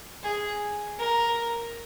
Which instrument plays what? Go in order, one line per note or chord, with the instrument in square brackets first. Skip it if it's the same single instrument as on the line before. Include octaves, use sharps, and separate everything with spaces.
[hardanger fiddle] G#4
A#4